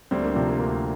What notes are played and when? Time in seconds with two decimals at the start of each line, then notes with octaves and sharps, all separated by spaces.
0.11 D2 G3 C4
0.23 A#3 D4
0.35 C3 F3 G3 C4
0.48 A#3
0.59 D2 A#3